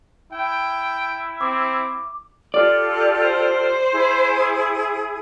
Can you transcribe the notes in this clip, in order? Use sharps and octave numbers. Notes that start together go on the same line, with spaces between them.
E4 G5
C4 D6
F4 G4 A4 D5
C5
E4 G#4